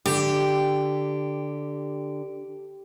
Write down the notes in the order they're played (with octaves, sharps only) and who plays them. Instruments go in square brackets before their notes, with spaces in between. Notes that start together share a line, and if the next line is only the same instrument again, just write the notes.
[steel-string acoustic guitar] D3 [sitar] G4